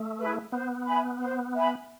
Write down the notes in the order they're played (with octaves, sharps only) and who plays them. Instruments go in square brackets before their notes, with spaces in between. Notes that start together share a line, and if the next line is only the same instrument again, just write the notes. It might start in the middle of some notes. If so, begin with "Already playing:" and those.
Already playing: [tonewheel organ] A3
[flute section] E4 G#4 B4
[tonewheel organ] B3 [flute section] C5
[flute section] E5 G#5 B5
C5
E5 G#5 B5